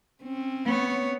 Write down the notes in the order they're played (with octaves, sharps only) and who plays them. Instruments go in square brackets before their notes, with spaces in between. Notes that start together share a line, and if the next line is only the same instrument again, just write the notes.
[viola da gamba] C4 C#4
[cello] B3 C#5